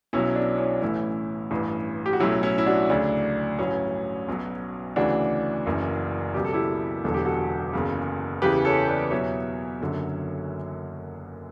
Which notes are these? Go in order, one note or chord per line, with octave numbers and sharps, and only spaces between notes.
B1 B2 F#3 C#4 E4
D4
C#4 E4
A1 A2 E3 C#4 E4
A1 G2 E3
G4
F#4
B1 A2 F#3 C#4 E4
C#4 E4
E4
D4 F#4
D2 C#3 F#3 D4
A1 G2 F#3 C#4 E4
B1 B2 F#3
D2 C#3 E3 D4 F#4
F#1 F#2 E3
C#2 B2 F#3 G4
A4
E4 G4
E1 E2 D3 F#3 A4
G4
F#4 A4
F#1 E2 C#3
E2 C#3 E3 G4 B4
A4 C#5
B4 D5
E2 B2 F#3 C#5 E5
F#1 F#2 D3 F#3